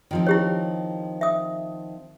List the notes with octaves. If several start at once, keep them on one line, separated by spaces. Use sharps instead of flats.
D#3 F3 C4
E4 G4 C#5
E5 D#6